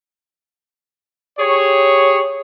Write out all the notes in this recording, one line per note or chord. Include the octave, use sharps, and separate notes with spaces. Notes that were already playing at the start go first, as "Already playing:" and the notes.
G4 G#4 C#5